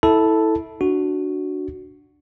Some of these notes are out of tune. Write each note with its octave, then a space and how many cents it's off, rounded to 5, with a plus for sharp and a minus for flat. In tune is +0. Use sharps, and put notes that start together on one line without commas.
E4 -20 A4 +0 A5 +0
D4 +0 F#4 +0